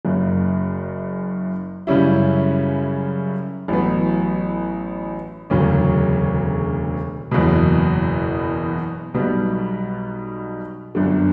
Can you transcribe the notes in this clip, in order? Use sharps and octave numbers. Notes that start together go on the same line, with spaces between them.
F#1 F#2 C#3
F#2 C#3 G3 C#4 E4
A1 A2 F#3 B3
E1 D2 C#3 F#3 C#4
F#1 E2 B2
B1 B2 G3 B3
G1 F#2 D3